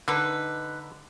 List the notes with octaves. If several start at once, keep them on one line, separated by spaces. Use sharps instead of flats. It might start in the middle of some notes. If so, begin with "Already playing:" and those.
D3 D#4 B4